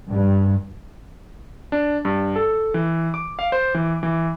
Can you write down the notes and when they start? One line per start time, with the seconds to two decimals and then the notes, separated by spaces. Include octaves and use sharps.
0.11 G2
1.72 D4
2.05 G2
2.36 A4
2.74 E3
3.14 D6
3.39 F5
3.52 C5
3.75 E3
4.03 E3